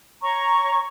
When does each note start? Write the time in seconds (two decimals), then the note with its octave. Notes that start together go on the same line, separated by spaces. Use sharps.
0.22 C#5 A#5 C#6